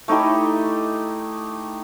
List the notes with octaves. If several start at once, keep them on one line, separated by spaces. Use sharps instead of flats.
A3 D#4 E4 G4